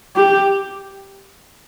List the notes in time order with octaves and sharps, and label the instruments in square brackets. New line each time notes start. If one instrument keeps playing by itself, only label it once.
[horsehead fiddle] G4